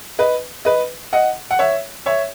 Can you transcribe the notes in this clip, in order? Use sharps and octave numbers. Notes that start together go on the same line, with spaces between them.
B4 D#5
B4 D#5
D#5 F#5
F#5
C#5 E5
C#5 E5